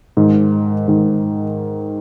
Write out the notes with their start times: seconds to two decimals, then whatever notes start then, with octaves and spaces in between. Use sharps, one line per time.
0.17 G#2 D#3
0.88 G#2 D#3